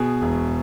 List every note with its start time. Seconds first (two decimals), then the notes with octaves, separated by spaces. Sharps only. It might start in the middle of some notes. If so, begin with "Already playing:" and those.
Already playing: B2 G#4
0.22 E1